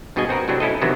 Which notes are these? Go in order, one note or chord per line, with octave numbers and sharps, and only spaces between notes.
G2 B2 F#4 G#4 D#5 G#5
C4 F#4 A#4 B4
A2 C3 F#3 C4 D4
C#4 E4 A4 D#5
C3 D#3 E3 F#3 B3 F#4